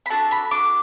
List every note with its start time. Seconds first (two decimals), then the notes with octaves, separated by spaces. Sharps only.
0.06 B5
0.10 D4 F#4 A4 A5
0.31 B5
0.51 D4 F#4 A4 D6